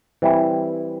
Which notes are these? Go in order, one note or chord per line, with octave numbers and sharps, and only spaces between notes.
E3 G3 C4 E4